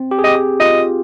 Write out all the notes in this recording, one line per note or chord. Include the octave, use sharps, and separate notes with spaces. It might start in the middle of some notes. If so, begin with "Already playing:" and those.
Already playing: C4
G4
G#4
G4 D#5
G4
F4 D#5